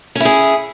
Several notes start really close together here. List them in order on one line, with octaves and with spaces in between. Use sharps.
C#4 E4 G#4